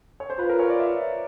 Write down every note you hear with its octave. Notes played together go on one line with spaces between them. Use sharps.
C#5
C5
F4 B4
A#4
C#5
D5
E5